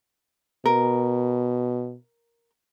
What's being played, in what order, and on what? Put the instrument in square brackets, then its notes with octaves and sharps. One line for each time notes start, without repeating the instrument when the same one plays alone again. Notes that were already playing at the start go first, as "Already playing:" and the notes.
[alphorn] B2 [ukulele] A#4